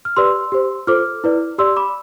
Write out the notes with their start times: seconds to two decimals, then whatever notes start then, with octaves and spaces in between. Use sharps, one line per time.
0.05 F6
0.17 G4 B4 D5 C6 E6
0.52 G4 C5
0.87 F4 A4 C5 D6 F6
1.24 E4 B4 D5
1.58 G4 D5 C6 E6
1.76 B5 D6